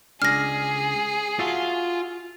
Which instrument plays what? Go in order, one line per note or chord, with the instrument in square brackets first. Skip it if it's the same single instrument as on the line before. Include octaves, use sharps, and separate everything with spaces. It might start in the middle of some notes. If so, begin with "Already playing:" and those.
[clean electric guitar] C#2 D4 [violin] G#4 [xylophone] F6 A#6
[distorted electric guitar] F4 [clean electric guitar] F#4 E5 A5